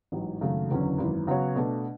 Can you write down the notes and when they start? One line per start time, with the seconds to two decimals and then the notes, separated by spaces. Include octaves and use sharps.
0.12 A1 G#2 F#3
0.41 G#1 F#2 C#3 F#3 A3
0.70 F#1 E2 D3 F#3 C#4
0.98 G#1 F#2 E3
1.27 C#3 F#3 B3 F#4 C#5
1.56 B2 A3 D4